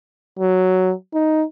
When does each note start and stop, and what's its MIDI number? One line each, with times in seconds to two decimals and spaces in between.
0.39 0.92 54
1.14 1.43 63